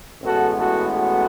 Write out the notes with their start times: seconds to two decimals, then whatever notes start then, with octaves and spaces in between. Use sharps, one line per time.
0.21 A1 A2 G#3 B3 F#4 A4
0.57 F#4 A4
0.92 F#4 A4